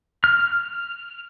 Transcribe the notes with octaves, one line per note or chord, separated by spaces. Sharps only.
F6